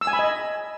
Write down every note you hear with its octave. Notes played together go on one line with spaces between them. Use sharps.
E6
G#5
B5
D#5